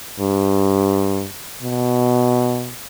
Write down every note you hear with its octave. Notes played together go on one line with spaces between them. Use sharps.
G2
B2